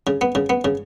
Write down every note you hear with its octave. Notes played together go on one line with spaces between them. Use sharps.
C#3
B3
C#3
B3
C#3